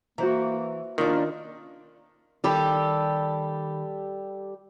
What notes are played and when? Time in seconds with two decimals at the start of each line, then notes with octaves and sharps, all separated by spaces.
0.18 E3 A#3 F#4 C5 A#5
0.98 D#3 A#3 C#4 D4 F4
2.44 D#3 G3 G4 A4 B5